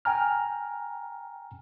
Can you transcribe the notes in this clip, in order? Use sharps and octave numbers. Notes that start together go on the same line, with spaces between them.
G5 G#5 A#5 F6